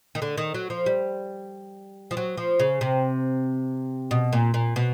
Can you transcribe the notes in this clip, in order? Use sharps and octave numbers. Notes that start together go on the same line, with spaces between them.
D#3
D3
D#3
F#3
F3
G3
F3
F#3
F3
C#3
C3
B2
A#2
A#2
B2